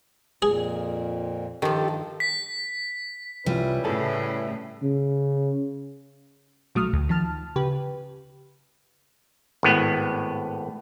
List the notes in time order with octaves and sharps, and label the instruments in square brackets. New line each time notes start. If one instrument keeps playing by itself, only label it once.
[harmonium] F2 A#2 [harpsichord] G#4
[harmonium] G2 [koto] D#3 F3 [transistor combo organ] G4 A4
[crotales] B6
[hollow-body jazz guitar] C2 F4 [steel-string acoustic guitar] G3 [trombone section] C#4 E4 B4
[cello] A2 C#3 [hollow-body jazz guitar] G#4 A4
[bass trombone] C#3
[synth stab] B1 F#3 A3 D#6 F6
D2
D#3 F3 A5 F6
C#3 G4 B4
[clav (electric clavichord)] G#1 A2 B3